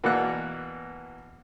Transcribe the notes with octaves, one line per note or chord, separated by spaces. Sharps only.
B2 E3 A#3 D5 F#5 F#6